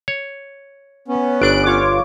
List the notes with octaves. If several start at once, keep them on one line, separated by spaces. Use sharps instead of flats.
C#5
B3 C#4
G1 D4 F#6 D7
F4 C#5 D6